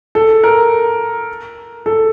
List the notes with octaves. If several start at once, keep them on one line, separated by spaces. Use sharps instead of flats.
A4
A#4
A4